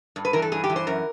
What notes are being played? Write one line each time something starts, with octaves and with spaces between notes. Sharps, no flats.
G2
B4
E3 A#4
A4
G2 G#4
G4
E3
C5
F#2 A#4